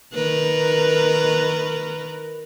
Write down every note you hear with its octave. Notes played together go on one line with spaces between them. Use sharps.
D#3 A#4 B4